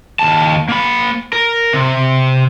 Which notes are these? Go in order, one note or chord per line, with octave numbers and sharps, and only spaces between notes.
D#2 A5
A#3 B5
A#4
C3